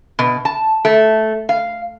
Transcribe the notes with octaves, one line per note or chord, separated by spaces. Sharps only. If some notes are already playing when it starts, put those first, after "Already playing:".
B2
A5
A3
F5